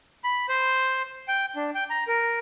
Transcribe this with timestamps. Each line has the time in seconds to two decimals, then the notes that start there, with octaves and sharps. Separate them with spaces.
0.24 B5
0.49 C5
1.28 G5
1.56 D4
1.75 G5
1.90 A#5
2.08 A#4